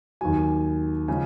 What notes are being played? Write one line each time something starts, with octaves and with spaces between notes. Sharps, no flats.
D#2 D#3 F#3 G#5
C#3 F3 G#3 G#5